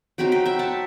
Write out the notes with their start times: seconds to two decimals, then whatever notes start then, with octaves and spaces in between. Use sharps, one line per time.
0.18 F#3 C4 D#4 G5 B5
0.32 G5 B5
0.45 E5 G5
0.59 F#5 A5